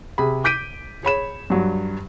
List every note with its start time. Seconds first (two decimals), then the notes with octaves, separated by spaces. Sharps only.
0.18 C3 G#4 B5
0.44 D6 G6 B6 D7 D#7
1.03 G#4 C#5 B5 E7
1.50 G2 F#3